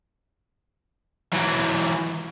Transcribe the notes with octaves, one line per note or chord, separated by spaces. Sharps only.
E3 F#3